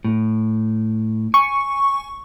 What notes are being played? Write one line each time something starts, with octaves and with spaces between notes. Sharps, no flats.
A2
G#5 C#6